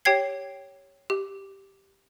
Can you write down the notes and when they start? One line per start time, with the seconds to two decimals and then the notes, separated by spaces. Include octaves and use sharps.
0.05 G4 C#5 G5 G#6 C7
1.10 G4